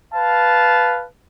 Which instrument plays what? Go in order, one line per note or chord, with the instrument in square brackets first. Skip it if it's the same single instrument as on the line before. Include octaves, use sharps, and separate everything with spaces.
[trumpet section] B4 F5 A5